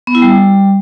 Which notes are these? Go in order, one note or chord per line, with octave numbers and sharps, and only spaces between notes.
B3
E4
G3